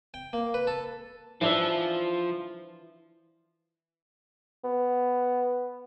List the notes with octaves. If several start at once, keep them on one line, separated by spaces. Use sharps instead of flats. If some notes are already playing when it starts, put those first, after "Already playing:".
G5
A#3
B4
A4
E3 F3 D4 E5
B3